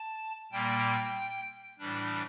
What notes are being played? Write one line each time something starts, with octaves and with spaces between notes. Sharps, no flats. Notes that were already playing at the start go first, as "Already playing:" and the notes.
Already playing: A5
A#2 G3 A#3 G5
A2 E3 G3 D4